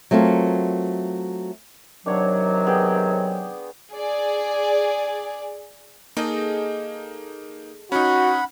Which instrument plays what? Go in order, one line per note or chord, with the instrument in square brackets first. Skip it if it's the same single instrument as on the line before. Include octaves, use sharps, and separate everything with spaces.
[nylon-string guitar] F#3 A3 C4 F4 A#4
[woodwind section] C3 D#3 F#3 [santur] D4 C#5 F#5
[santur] B3 G#4 G5
[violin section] G#4 D5
[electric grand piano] A#3 D#4 [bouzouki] G#4 A4 D#5
[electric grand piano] C#4 D#4 [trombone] F#4 [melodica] F#5 B5